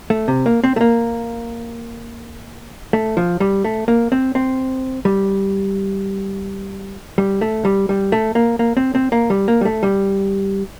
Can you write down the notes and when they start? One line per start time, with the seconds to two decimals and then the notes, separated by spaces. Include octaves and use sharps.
0.10 A3
0.28 C3
0.46 A#3
0.64 C4
0.76 A3
0.81 A#3
2.93 A3
3.17 F3
3.40 G3
3.64 A3
3.88 A#3
4.12 C4
4.35 C4
5.05 G3
7.18 G3
7.41 A3
7.65 G3
7.89 G3
8.12 A3
8.35 A#3
8.59 A#3
8.77 C4
8.95 C4
9.12 A#3
9.30 G3
9.48 A#3
9.61 G3
9.65 A3
9.83 G3